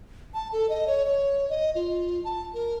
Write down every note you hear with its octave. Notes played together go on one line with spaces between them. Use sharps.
A5
A4
D#5
C#5
C#5
D#5
F4
A5
A#4